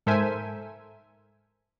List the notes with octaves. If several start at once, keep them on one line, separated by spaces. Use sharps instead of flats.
G#2 A4 A#4 C5 E5 G#5